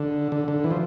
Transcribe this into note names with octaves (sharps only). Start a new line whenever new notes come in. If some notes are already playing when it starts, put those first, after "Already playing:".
Already playing: D3
D3
D3
E3
F3